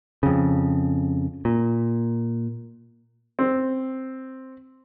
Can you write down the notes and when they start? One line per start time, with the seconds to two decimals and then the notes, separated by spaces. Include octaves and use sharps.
0.23 F2 C#3
1.45 A#2
3.39 C4